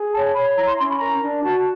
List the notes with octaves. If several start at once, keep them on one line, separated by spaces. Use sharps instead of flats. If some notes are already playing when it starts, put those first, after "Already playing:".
Already playing: G#4
C#5 A5
C#5 B5
E4 A#5
C6
C#4 C6
B5
A#4 A#5
D4
F#4 A5